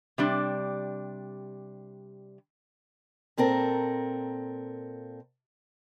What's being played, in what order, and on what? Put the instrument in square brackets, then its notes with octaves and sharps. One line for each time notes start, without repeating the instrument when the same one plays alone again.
[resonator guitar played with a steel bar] C3 G3 D4
[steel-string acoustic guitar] A#2 C4 A4 A#4